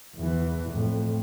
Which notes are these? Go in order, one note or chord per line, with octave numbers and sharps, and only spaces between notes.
E2 E3
F2 A2